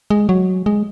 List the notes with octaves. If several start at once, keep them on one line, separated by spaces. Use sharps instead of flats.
G#3
F#3
G#3